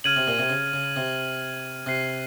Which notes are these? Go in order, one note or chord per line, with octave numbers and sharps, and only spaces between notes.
C#3 F6 G#6 D#7 F#7
C3
A#2
C3
C#3
C#3
C3
C3 F#6 C7 D#7